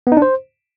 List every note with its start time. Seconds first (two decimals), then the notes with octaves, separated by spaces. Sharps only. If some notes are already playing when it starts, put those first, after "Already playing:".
0.07 B3
0.12 D#4
0.17 D4
0.22 C5